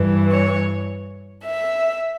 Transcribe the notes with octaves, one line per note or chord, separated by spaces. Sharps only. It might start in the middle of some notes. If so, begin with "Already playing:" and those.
Already playing: G2 E3
C#5
E5